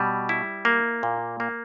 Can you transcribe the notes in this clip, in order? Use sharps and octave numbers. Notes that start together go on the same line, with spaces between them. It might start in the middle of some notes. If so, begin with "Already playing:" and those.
Already playing: B2 G3
E4
A#3
A#2
A#3